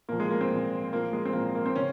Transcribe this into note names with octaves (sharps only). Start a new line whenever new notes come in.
A#2 F3 A#3
G#3
A#3
C4
A#2 F3
A#2 F3 A#3
G#3
C4
A#2 F3 A#3
A#3
C4
C#3 C#4